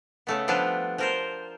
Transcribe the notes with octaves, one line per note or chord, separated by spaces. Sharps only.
C#3 A3 B3
F3 G3 B3 D4
F3 A#4 C5